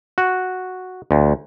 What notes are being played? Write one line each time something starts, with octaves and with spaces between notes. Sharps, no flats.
F#4
D2